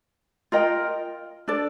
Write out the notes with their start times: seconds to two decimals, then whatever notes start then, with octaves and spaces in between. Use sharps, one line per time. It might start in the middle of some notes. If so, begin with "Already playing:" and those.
0.52 F4 A#4 D#5 G5
1.48 D4 A4 D5